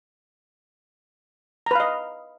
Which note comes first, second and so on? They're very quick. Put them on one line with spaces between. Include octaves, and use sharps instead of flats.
A#5 B4 F5 D#5